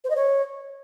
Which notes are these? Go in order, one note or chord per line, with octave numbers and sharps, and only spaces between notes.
C5
D#5
C#5